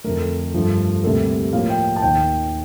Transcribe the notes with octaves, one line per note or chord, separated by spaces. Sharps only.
F2 D3 A3 A#4
G2 F3 A3
D2 C3 G3 A#3 A4
A2 F3 A#3 F5
G5
A5
D#2 D#3 A#3 G5